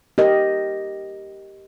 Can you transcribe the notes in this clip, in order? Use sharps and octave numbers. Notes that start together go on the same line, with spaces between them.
G4 A#4 D#5